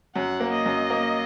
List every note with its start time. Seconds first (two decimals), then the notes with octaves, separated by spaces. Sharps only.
0.15 F#2 F#5
0.40 A#3
0.53 D#5
0.66 F#2
0.90 A#3